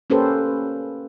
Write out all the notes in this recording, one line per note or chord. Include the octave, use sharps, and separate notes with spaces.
A#3 C#4 G4 A4 B4 C5